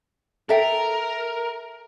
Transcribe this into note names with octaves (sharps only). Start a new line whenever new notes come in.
A4 A#4 E5 G5